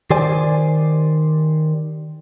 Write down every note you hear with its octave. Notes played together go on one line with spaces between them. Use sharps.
D#3 G4 C5 D5 G#5